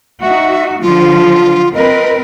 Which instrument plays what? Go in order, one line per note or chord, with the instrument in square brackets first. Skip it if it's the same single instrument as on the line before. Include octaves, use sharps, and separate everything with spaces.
[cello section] D#4 F#4 [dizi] E5
[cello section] D3 F3 [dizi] F4
[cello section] C4 A#4 B4 [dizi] D#5